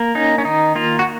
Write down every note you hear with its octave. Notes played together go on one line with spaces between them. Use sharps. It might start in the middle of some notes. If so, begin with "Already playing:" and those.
Already playing: A#3
C#4 D#4
C#4
D#3 D#4
A#3 F4
F#4